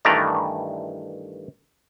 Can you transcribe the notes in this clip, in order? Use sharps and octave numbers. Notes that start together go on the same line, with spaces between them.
G2 D#3 E3 A3 D5 A#5